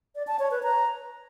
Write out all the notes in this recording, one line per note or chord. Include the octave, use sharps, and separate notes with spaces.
D5
A5
C#5
B4
A#5